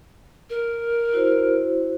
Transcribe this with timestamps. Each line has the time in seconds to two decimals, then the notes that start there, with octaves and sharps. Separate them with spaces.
0.50 A#4
1.13 E4 F#4 C5